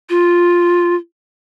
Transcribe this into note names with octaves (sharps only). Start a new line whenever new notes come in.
F4